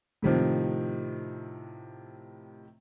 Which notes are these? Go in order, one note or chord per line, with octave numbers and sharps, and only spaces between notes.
A2 C3 D#3 F3